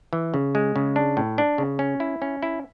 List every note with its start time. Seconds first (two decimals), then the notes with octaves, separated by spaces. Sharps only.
0.13 E3
0.34 C#3
0.55 G#3
0.76 C#3
0.96 D4
1.17 A2
1.38 D4
1.58 C#3
1.79 C#4
2.00 E4
2.22 C#4
2.43 E4